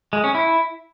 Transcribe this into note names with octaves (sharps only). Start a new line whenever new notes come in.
G#3
C#4
E4